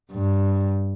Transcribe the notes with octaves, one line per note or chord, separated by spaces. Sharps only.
G2